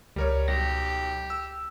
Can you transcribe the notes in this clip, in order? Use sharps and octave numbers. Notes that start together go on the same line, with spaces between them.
C#2 G3 A#4 C#5
B1 G4 A#6
E6